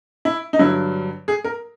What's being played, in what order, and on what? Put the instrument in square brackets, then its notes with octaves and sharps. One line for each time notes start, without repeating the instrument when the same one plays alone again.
[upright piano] E4
D#4
G2 D3 F#3 E4
G#4
A#4